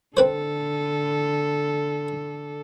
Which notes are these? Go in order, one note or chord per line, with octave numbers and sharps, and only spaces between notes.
D3 C4 A4 B4 C5